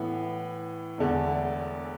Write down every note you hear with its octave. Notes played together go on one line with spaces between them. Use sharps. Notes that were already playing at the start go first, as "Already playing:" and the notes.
Already playing: A2 E3 B3
E1 E2 D3 A3